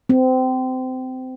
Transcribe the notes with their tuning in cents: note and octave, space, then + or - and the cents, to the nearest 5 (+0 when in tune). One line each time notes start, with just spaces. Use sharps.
C4 -25